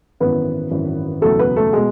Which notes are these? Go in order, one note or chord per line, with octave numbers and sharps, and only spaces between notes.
G#1 F#2 E3 B3 B4
G#1 F#2 E3
F#1 E2 B2 F#3 A3 A4
B3 B4
A3 A4
B2 G#3 G#4